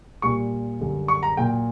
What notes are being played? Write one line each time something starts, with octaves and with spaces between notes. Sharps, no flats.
A#2 G3 C#6
F#2 D3 G3
C#6
A#5
A#2 F#3 G5